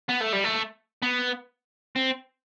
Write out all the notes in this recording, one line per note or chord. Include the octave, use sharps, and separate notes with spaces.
B3
A3
G3
A3
B3
C4